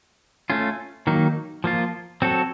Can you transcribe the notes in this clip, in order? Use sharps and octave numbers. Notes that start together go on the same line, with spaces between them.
A3 C#4 F4
D#3 F#3 A#3 D#4
F3 A#3 F4
F#3 C4 F#4 A4